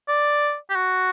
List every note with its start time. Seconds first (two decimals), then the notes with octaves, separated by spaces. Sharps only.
0.08 D5
0.70 G4
0.76 F#4